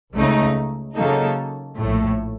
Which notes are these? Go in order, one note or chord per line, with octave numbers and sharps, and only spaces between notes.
C#2 C#3 A3 D#4
C#3 F#3 A#3 D#4 A4
A#1 A2 A3